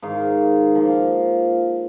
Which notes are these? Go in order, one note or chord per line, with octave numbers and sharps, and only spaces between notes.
G#2 D#3 F5
A#2 F3 F5